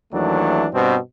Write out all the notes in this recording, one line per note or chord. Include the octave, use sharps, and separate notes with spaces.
D#2 E3 F#3 A3 D4
G2 B2 C4